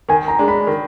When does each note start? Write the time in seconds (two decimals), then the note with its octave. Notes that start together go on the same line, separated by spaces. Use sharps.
0.09 D#3 G#5
0.28 A#5
0.39 G#3 D4
0.48 B5
0.67 D#3